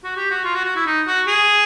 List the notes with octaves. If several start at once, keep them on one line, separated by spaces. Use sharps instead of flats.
F#4
G4
F#4
F4
F#4
F#4
E4
D#4
F#4
G#4